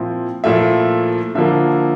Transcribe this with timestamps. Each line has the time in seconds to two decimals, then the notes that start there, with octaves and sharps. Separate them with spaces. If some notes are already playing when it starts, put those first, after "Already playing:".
Already playing: A#2 F3 C4 E4
0.44 A#2 F3 A3 E4 E5
1.35 D3 F3 A#3 E4 E5